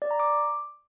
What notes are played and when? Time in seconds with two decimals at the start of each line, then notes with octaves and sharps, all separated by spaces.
0.02 D5
0.11 A#5
0.20 D6